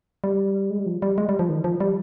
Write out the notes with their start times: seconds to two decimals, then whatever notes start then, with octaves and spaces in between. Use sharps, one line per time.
0.24 G3
0.70 G#3
0.79 G3
0.86 F3
1.02 G3
1.18 G#3
1.29 G3
1.39 F3
1.49 D#3
1.64 F3
1.80 G3